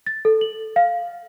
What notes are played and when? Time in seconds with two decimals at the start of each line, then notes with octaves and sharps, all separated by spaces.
0.07 A6
0.25 A4
0.41 F#7
0.76 F5